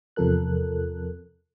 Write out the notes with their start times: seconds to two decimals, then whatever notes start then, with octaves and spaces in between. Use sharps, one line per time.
0.16 E2 C3 F3 A4 A#4 F#6